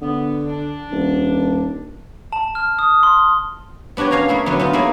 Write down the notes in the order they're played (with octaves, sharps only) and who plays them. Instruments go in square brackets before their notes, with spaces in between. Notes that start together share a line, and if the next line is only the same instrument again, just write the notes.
[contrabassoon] D3 [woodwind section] B3
[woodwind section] D4
[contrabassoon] D#1
[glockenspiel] A5
F6
D#6
C6
[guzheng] B3 D4 F#4 G4 C#5
C#4 C#5 F5 G#5 A#5
A3 A#3 E4 G#4
D3 F#3 B3
B3 D#4 F4
A#3 B3 E4 G#4 C#5